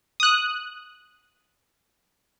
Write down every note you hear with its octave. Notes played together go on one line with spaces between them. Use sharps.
D#6 F#6